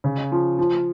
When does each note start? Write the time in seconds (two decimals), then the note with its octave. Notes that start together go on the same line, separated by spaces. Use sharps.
0.04 C#3
0.32 F3
0.59 F3